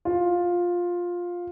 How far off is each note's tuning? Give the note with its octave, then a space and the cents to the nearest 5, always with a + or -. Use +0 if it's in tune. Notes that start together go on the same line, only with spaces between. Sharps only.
F4 +10